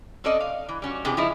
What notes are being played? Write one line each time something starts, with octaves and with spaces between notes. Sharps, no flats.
C4 C#4 A4 D5 D#5
F5
E3
G3 C#4 F#4
C3 E3 D4 G4 G#4
C#3 F3 C#4 D#4 E4 G#4